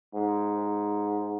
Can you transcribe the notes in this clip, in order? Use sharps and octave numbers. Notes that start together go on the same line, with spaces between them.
G#2